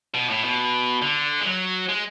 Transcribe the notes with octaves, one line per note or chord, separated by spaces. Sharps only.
B2
A2
B2
D3
G#3
F#3
G#3